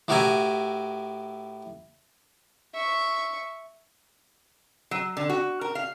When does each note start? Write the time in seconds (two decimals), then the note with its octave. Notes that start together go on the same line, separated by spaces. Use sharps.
0.08 A2 F#4 G4 A#4 E5 G#5
2.74 E5 C#6
4.91 F#3
5.17 D3
5.30 F#4
5.61 A#4
5.75 F5